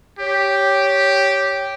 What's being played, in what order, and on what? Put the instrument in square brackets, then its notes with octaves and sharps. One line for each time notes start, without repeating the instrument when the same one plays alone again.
[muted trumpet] G4 [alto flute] C#5